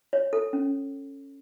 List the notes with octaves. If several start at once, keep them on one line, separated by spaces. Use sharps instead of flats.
C#5
A4
C#4